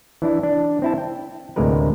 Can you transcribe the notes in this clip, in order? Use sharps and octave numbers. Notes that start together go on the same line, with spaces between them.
E3 D4 E4
D4
C4 E4 A5
G5
D2 A2 C3 G#3 A#4 B4